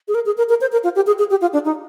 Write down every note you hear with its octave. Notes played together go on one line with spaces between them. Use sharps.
G#4
A#4
G#4
A#4
A#4
C5
A#4
F4
G4
G#4
G#4
G4
F4
D4
D#4